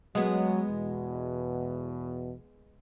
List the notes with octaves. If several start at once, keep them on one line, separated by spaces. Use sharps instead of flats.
F#3 G#3 B3
E2 B2